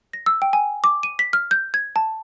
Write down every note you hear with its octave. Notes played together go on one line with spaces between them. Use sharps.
A#6
E6
G5
G#5
D6
D#7
B6
F6
G6
G#6
A5